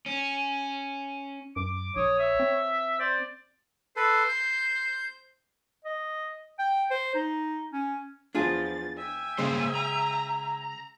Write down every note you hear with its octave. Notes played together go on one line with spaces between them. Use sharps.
C#4
F#2 D6
A#1 C#5 D#6
E5
C4
C5 D5
A4 B4 C5
G6
D#5
G5
C5
D#4
C#4
E2 F3 D4 F4 G#4 A6
E5 G5 G#5
G2 C#3 G#3 A#3 C5
A#5